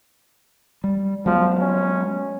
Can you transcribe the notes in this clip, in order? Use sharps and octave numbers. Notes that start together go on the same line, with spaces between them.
G3
F3 F#3 G#3 B3
C#4